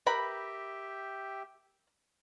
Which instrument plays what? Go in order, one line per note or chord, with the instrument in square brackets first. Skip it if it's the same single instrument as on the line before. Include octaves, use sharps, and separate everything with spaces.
[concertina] G4 E5 G5 [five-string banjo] A#4 B4 B5